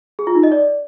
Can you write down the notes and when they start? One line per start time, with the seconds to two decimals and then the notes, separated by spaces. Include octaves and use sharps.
0.19 G#4
0.27 F4
0.35 D#4
0.43 D#5
0.52 D5